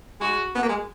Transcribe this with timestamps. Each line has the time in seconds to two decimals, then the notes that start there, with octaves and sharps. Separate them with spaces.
0.20 G#3 F#4
0.55 B3
0.63 A#3
0.69 G#3